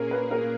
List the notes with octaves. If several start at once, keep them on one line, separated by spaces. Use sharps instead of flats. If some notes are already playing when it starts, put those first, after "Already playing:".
Already playing: A#2 A#3 C#4 G#4 A#4
B4
A#4